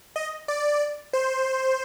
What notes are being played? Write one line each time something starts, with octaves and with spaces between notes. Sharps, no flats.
D#5
D5
C5